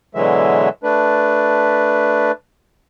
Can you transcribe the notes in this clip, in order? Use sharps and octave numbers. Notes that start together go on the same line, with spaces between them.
B2 D3 E3 F#3 G#3 E5
A3 D4 B4